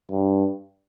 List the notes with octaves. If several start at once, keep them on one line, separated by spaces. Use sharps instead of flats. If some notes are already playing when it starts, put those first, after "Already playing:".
G2